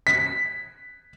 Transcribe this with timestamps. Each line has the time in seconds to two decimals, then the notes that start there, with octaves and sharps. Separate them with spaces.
0.07 B6